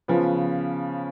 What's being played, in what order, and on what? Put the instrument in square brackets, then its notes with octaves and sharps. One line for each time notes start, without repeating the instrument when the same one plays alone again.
[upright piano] C#3 F3 B3 F4